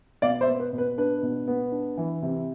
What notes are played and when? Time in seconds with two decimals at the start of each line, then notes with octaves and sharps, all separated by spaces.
0.22 B2 D5 F5
0.41 C5 E5
0.47 B3
0.60 B4
0.73 B2
0.78 B4
0.98 D4 B4
1.23 B2
1.48 B3
1.72 D4
1.98 E3
2.22 C3